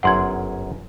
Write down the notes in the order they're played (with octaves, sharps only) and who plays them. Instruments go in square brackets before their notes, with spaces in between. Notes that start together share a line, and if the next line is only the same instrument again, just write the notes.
[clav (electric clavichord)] G1 F#2 G5 [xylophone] F#5 C6 G#6